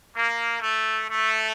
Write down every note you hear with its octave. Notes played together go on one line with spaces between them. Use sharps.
A#3
A3
A3